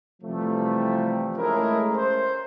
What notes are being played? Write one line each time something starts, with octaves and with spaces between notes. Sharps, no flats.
C3 E3 F3 G3 A3
G#3 A3 C#4 E4 G#4 A#4
C5